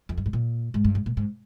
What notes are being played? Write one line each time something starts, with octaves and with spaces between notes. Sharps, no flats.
F2
G2
G#2
A#2
G#2
G2
G#2
A#2
G#2